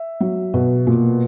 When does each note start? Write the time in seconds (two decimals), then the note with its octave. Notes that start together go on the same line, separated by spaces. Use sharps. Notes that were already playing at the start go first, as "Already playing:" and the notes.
Already playing: E5
0.20 F#3
0.54 B2
0.87 A#2